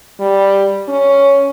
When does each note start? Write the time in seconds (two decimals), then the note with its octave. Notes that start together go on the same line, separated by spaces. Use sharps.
0.20 G3
0.88 C#4